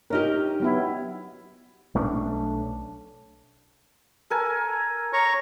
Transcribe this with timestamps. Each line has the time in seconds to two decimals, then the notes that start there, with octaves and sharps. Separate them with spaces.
0.10 C#4 D#4 G4 A#4
0.60 F#3 B3 E4
1.95 B1 A3 C#4 D4
4.30 A4 A#4 G#5
5.13 C#5 A#5 C#6